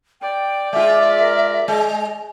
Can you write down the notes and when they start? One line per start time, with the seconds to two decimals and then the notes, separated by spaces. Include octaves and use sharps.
0.21 D5 G5
0.73 G#3 F4 E5 D6
1.20 A#4
1.68 G#3 D#5